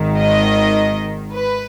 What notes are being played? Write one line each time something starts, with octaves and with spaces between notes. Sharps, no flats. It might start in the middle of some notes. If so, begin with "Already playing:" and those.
Already playing: G#1 G#2 D#3
D#5
B4